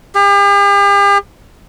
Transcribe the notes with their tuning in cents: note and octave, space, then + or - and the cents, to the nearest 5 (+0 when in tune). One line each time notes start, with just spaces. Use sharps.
G4 +45